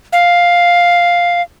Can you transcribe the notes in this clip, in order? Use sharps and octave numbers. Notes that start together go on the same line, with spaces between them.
F5